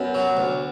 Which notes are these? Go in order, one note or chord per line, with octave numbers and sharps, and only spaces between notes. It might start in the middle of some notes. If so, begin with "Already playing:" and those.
Already playing: F#2 B3
F#3
D2